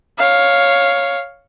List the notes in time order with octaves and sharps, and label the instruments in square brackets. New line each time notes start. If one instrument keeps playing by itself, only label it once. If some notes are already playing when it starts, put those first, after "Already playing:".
[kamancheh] C#5 F5